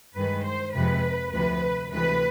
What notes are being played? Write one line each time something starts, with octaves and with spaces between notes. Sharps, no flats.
G2 D#3 G#3 B4
C5
F2 C3 F3 G#3 B4
D2 C3 F3 B4
D2 C3 E3 G#3 B4